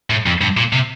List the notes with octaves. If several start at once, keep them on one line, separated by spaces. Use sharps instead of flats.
A2
F2
G2
A#2
C3